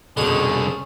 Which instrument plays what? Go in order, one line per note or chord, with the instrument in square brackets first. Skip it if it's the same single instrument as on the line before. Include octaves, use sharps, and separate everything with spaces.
[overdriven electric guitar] C2 D3 [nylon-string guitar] F2 B2 [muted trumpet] C#4 [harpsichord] G#4